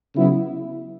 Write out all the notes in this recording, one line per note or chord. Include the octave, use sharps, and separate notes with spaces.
C#3 F#3 B3 E4